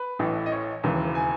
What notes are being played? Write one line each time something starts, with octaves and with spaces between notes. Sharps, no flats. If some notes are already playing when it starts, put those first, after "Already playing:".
Already playing: B4
A1 A2 E3
D#5
C#5
E1 D#2 C#3 E3
G#5